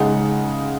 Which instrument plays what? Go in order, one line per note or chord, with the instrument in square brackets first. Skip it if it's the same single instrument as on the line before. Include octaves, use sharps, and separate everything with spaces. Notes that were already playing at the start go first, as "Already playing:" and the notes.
Already playing: [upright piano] C#3 G#3 D#4 F#5